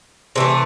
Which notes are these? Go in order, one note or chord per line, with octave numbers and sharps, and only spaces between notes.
C3 E3 A3